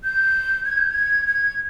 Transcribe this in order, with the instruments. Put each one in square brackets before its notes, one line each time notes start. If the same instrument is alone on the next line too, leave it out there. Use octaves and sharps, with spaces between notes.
[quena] G6
G#6
G6
G#6
G#6